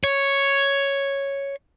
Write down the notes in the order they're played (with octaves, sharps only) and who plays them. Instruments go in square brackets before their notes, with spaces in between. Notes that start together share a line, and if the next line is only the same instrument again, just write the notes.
[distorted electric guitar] C#5